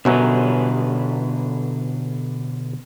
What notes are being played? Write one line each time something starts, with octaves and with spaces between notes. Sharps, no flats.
A1 F#2 B2 D3 F#3 B3 B4